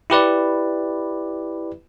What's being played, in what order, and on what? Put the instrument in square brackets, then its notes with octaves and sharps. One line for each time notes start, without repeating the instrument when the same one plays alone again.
[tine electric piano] E4 G4 B4 D5